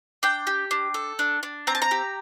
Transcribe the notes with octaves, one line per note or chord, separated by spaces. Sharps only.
D4 G5
G4
D4
A4
D4
D4
C4 A#5
A5
A#5
G4